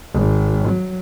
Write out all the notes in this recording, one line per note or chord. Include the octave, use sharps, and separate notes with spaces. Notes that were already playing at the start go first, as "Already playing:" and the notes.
G#1
F#3